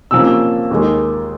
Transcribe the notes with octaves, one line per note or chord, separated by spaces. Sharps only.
C3 F3 A#3 C#4 E6
D#2 D#3 G#3